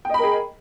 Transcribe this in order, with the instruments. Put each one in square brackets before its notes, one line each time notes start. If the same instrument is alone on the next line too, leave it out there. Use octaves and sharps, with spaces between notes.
[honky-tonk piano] G5
D#5
B5
A#4
G#4